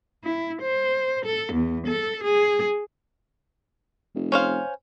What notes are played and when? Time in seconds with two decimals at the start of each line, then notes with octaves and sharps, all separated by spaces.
0.24 E4
0.61 C5
1.25 A4
1.54 E2
1.87 A4
2.23 G#4
4.15 F1
4.32 C#4 C5 F5